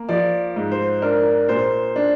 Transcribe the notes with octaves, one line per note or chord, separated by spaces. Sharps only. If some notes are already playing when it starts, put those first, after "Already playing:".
Already playing: A#3
F3 D5
G#2
C5
D4 A#4
A#2 C5
D4